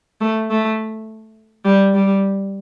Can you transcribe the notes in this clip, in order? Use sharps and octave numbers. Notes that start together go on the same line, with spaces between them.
A3
A3
G3
G3